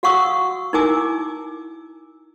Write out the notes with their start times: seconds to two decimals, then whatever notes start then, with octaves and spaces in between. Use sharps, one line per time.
0.03 F#4 F5 F#5 C#6 D#6 E6
0.73 D#4 E4 A#4 G#5 D6 E6